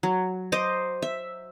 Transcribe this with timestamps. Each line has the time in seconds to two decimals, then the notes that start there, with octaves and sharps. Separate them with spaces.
0.03 F#3
0.52 C5 D#5 D6
1.02 E5